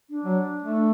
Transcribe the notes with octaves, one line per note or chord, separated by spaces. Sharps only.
D4
F#3
A3
D4